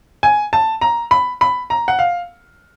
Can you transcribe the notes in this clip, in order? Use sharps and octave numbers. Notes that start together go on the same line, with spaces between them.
G#5
A5
A#5
B5
B5
A#5
F#5
F5